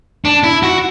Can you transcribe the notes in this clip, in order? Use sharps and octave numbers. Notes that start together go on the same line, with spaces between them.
D4
E4
F#4